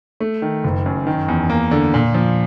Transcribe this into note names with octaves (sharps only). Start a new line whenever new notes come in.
A3
D#3
F#1
F#2
D#3
E2
A#3
D3
A#2
F3